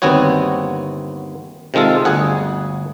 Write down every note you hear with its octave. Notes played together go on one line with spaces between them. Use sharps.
G1 D#2 B3 C4 F#4 C#5
C3 D#3 G#3 F4 A4
G1 D2 G#4 F#5